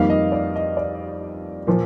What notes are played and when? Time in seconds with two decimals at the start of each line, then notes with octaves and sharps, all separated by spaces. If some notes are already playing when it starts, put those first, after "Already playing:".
Already playing: F2 D#3 G3 A#3 F5
0.10 D#5
0.32 D5
0.56 D#5
0.77 D5
1.67 A#2 F3 A#3